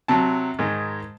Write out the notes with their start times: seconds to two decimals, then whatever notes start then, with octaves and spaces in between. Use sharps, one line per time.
0.08 C3 F#3 A5
0.59 G#2 D#3 G#3